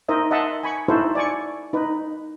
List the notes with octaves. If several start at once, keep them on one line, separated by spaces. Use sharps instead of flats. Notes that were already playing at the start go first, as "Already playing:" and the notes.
D#4 A#4 C5 D#5 E5
D#5 E5 F#5 A5 C6
G#5 B5 C#6
D#4 E4 F#4 A4 B4 C5
D5 G#5 C#6
D#4 B4